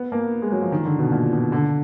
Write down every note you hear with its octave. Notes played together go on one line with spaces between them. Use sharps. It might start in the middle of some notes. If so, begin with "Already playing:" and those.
Already playing: B3
A#3
G#3
F#3
F3
D#3
D3
B2
A#2
B2
D3